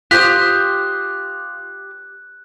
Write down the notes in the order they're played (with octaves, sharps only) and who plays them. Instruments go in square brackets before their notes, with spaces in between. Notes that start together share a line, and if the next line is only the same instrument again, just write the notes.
[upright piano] F4 A#6 [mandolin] G4 C5 D#6 [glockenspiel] F#6